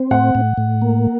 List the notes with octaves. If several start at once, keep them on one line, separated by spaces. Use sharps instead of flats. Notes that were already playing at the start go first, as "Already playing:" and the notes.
Already playing: C4
A2 F#5
A2
A2
A#3